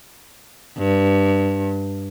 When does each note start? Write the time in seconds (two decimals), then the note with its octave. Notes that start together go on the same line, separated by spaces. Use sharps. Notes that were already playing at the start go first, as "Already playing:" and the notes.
0.79 G2